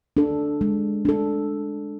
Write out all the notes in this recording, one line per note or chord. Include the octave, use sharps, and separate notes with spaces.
D4 A4
G#3
D4 A4